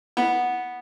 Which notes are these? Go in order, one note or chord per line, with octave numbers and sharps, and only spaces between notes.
B3